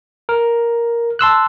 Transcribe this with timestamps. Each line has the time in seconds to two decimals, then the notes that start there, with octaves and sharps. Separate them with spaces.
0.29 A#4
1.19 A5 C6 E6 F#6